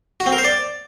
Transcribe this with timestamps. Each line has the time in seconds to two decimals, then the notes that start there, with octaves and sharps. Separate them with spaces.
0.20 F#4
0.26 C4
0.32 A#4
0.38 C5
0.44 D5